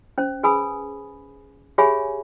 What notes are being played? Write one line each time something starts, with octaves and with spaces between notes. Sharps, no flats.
C#4 C5
G#4 B4 G#5 B5 D#6
G4 G#4 C#5 E5 G#5 B5